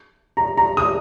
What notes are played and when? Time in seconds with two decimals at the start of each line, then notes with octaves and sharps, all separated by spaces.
0.37 A#5
0.57 A#5
0.77 D#6